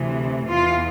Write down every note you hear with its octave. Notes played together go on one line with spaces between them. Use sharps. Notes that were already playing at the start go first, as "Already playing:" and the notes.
Already playing: D2 C3 E3
E2 E3 F4